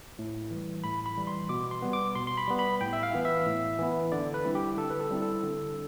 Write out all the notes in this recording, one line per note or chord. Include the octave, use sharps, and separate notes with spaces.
A2
E3 G3
A2 B5
B5
E3 G3
C6
B2 D6
C6
G3 B3
D6
B2 C6
C6
B5
G3 B3
B5
A2 G5
E5
F5
E3 B3 E4
E5
A2
E3 B3 E4
D3 D5
B4
G3 C4 E4
G4
D3 A4
B4
A4
G3 C4 E4
A4
D3